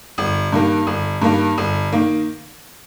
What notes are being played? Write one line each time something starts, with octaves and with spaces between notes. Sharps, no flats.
G1
G2 D#3 A#3
G1
G2 D#3 A#3
G1
D#3 A#3